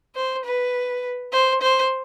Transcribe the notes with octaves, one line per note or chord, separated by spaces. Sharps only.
C5
B4
C5
C5